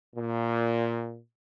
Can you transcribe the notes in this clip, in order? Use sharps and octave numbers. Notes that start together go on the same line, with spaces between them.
A#2